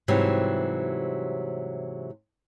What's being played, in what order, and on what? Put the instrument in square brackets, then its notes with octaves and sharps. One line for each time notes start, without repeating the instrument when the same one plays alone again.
[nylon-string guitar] G#2 C3 E3 F#3 G3